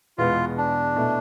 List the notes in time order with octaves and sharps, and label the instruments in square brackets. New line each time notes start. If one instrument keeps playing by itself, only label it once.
[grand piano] E2 B2 G#3 B3 [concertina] F4
[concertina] D4
[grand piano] B2 A3 E4